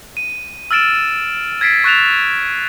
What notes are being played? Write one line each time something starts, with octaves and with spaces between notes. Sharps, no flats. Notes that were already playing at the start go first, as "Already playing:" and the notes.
D#7
E6 F6 A6 D7 E7
G#6 A6 B6 C7 D7
C#6 F#6 A6 E7 F7